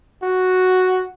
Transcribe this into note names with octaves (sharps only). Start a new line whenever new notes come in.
F#4